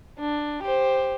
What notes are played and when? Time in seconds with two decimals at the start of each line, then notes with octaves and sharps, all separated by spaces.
0.20 D4
0.63 G4 C5